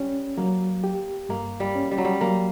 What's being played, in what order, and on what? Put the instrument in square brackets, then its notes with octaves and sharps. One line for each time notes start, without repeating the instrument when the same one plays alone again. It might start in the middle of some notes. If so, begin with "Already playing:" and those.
Already playing: [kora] G3 [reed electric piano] C#4
[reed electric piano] F#3 [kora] A#3
[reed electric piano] G4
[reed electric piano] G2 [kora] A#3
[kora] G3
[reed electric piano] C#4
[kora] G3
F#3
G3
[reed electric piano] F#3 [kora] A#3